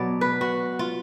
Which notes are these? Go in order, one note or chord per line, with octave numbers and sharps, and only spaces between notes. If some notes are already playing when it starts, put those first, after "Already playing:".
Already playing: B2 F#3 B3 D5
B4
F#4
F4